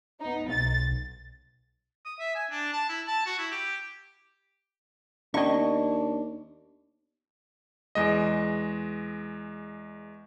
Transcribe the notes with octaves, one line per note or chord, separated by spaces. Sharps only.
B3 D#4
B1 A6
D#6
E5
G#5
D4
A5
E4
A5
F#4
E4
G4
D#2 B3 C#4 D4 D#5 C#6
E2 G#3 D#5